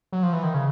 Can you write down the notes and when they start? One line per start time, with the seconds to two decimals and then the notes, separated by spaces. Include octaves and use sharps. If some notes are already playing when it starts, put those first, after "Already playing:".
0.12 F#3
0.23 F3
0.33 E3
0.43 D#3
0.54 C#3